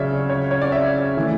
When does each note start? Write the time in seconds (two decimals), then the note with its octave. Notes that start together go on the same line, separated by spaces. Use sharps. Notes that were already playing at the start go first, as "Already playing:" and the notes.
Already playing: C#3 F#3 C#4 C#5 D5 E5
0.29 C#5
0.51 C#5
0.62 D5
0.72 E5
1.17 E3 A3